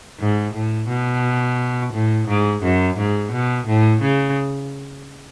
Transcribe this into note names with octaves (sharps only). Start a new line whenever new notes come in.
G#2
A2
B2
A2
G#2
F#2
G#2
B2
A2
C#3